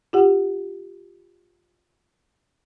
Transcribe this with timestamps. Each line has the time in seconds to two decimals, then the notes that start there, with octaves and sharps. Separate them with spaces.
0.13 F4 G4 F#5